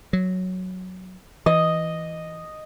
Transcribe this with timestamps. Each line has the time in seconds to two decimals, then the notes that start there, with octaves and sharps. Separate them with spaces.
0.13 F#3
1.46 E3 D#5